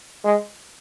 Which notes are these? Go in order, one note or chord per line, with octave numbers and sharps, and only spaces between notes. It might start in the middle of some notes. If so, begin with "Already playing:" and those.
G#3